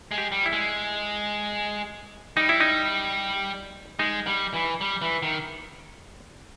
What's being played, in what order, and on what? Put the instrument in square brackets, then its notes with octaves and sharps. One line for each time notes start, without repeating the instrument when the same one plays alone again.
[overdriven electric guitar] G#3
[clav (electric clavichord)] G4
[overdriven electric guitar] G3
[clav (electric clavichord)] E4
[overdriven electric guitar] G#3
[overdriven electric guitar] G3 [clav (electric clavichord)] D#4
[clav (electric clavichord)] E4
D#4
[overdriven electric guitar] G#3 [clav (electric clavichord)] D#4
[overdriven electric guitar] G3
E3
G3
E3
D#3